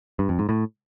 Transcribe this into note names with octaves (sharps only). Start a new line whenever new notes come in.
G2
F2
G#2
A2